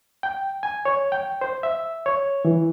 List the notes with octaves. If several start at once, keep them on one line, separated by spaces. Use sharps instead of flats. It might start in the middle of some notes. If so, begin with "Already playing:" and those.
G5
G#5
C#5
G5
C5
E5
C#5
E3